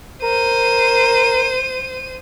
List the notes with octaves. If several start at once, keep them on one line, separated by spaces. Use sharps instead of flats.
A#4 C5 D#7